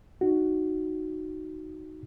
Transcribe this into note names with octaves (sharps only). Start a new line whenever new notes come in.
D#4 F#4